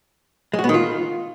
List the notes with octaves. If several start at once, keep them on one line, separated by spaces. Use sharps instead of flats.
G#3
F#4
B3
D#3
F4